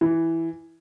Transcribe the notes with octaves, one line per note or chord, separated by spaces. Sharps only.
E3